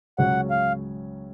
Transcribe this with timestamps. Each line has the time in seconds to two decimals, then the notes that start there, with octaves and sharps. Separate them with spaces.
0.18 C#2 C#3 F#3 C#4 F#5
0.50 F5